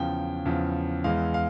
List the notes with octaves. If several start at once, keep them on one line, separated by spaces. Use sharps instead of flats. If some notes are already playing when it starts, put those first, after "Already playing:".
Already playing: E2 C#3 F3 G5
E2 C#3 F3
E2 E3 G#3 F5
F5